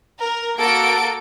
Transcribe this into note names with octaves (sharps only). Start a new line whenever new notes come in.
A#4
A#3 F#4 A4 D7